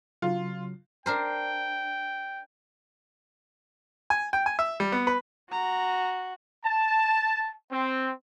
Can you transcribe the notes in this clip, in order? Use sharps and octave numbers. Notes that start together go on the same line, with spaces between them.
C#3 F#3 F4
D4 A#4 C5 G5
G#5
G5
G#5
E5
G3
B3
B4
F#4 A#5
A5
C4